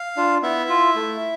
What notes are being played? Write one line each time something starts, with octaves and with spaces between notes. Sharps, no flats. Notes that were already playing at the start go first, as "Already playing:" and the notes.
Already playing: F5
D4 F4
B3 E4 E5
F4
A3